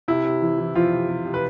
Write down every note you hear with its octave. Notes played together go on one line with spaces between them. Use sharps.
C3 E4
C3
E3
E3
E3 F3 F4
C3
C3
C3
B4